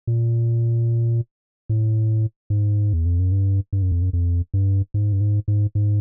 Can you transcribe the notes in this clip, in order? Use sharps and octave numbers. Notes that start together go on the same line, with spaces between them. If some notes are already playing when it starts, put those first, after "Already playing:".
A#2
A2
G#2
E2
F2
F#2
G2
G2
F#2
F2
F#2
F2
G2
G#2
G2
G#2
G#2
G#2